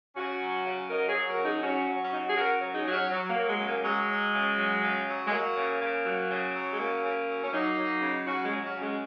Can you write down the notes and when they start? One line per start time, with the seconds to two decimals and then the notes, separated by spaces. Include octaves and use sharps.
0.16 C#3 C#4 F#4
0.41 F#3
0.66 C#3
0.89 F#3 A#4 D#5
1.08 G#4 C#5
1.14 F#3
1.26 F#4 A#4
1.39 C#3
1.44 D#4 G#4
1.63 F#3 C#4 F#4
1.87 F#3
2.02 C#4
2.11 C#3 D#4
2.19 F#4
2.28 G#4
2.36 C#3 F#4 A#4
2.61 F#3
2.73 D#4 G#4
2.86 F#3
2.92 C#4 F#4
3.10 F#3
3.29 A#3
3.36 F#3
3.48 G#3
3.59 C#3
3.66 A#3
3.84 F#3 G#3
4.09 F#3
4.34 C#3
4.58 F#3
4.83 C#3
5.07 F#3
5.26 G#3
5.31 F#3 A#3
5.55 C#3
5.81 C#3
6.05 F#3
6.29 C#3
6.55 F#3
6.72 G#3
6.79 C#3 A#3
7.03 C#3
7.28 F#3
7.44 C#4
7.52 F#3 A#3 D#4
7.76 F#3
8.01 C#3
8.26 F#3 C#4 F#4
8.44 G#3 C#4
8.51 F#3
8.63 C#4 F#4
8.75 C#3
8.81 G#3 C#4